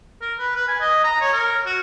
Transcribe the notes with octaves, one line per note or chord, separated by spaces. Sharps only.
A#4
B4
B4
G#5
D#5
A#5
C#5
A#4
F#4